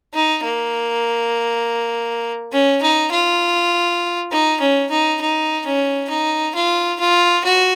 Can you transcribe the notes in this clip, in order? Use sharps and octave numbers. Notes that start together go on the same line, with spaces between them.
D#4
A#3
C#4
D#4
F4
D#4
C#4
D#4
D#4
C#4
D#4
F4
F4
F#4